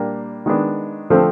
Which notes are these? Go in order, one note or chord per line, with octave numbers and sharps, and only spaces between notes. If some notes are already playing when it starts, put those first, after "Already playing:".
Already playing: A#2 G3 A#3 D4
D#3 G#3 B3 D4
D3 F3 A3 C4